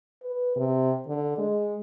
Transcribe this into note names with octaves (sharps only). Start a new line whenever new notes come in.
B4
C3
D3
G#3